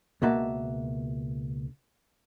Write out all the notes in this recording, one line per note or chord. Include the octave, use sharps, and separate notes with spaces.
C#2 B2 A#3 F#4 E5 A5